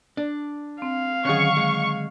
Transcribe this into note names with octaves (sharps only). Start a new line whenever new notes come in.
D4
C4 F5
D3 D#3 F#3 C#4 G#4 C#6
G#3